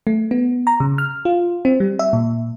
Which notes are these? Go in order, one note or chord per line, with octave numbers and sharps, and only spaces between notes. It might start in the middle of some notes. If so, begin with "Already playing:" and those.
A3
B3
A#5
C#3
F6
F4
C4
G3
E5
A#2